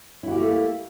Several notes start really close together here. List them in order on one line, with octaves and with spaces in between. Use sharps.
E4 F#4 G4 A#3 A3